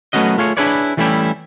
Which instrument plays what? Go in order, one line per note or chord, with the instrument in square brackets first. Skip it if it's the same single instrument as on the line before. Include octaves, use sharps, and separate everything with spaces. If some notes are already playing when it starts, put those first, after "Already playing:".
[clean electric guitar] F#3 A3 B3 C#4 F#4 D#5
A3 F4 G#4 C#5
D4 E4 G#4 B4 C#5 D5
E3 G3 A3 C#4 E4 G4